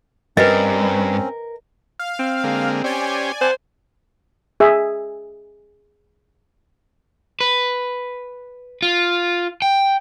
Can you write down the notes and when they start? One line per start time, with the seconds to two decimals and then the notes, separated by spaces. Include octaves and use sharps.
0.37 G2 C4 C#4 A#4 B4 D#5
1.99 F5
2.19 C4
2.44 D3 G#3 A#3
2.84 C#4 G4 C5 D5 G#5
3.41 C5 F#5 A5
4.60 G#4 E5
7.41 B4
8.82 F4
9.62 G5